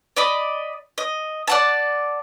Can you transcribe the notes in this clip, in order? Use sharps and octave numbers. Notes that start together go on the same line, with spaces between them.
D5 D#5 B5
D#5
D5 F#5 A5